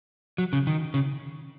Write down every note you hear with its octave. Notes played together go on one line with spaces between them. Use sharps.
F#3
C#3
D#3
C#3